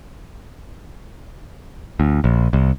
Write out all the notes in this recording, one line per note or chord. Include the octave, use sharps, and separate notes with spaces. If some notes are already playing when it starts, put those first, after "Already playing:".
D2
A#1
C2